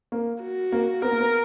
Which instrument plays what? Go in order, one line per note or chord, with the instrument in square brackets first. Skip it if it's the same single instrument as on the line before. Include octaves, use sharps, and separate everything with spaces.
[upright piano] A#3
[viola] F#4
[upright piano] A#3
[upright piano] B3 [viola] A#4
[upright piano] A#3
B3